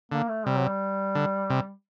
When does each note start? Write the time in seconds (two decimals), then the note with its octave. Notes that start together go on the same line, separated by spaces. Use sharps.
0.12 D3 A#3
0.29 A3
0.46 C3 G3
0.57 F#3
0.68 G3
1.15 D3
1.50 C3